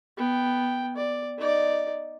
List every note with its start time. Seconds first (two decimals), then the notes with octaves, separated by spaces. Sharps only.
0.17 B3 G5
0.96 D5
1.38 D#4 D5